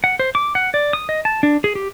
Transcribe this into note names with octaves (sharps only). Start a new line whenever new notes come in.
F#5
C5
D6
F#5
D5
D#6
D#5
A5
D4
G#4
G4